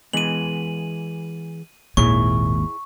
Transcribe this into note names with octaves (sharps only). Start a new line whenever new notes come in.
E3 G#3 B3 D#7 F#7
G#1 D#2 A#2 E4 G#4 C#5 C#6